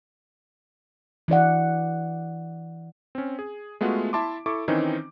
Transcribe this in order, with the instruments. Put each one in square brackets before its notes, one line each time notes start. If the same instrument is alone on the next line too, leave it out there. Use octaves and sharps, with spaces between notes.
[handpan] E3 E4 D5 F#5
[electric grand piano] C4 C#4
G#4
G#3 A3 B3 F4 F#4
E4 E5 A5 C6 D6
E4 A4 C#6 D6
D#3 E3 C4 C#4 D#4